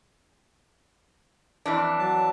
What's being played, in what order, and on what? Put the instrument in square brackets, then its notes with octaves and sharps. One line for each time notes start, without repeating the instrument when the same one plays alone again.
[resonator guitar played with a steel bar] F2 E3 D4
[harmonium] F#3 A5